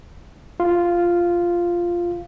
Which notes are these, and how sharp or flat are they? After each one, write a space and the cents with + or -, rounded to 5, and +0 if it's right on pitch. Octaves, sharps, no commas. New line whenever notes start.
F4 -5